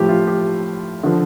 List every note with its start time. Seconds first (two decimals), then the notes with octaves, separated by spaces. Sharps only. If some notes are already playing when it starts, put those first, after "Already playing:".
Already playing: A2 F3 G4
0.09 F4
0.27 G4
1.03 D3 F3